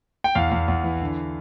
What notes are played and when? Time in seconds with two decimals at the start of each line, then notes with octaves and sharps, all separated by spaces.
0.24 G5
0.35 E2 F5
0.51 E2
0.68 E2
0.84 E3
1.01 D3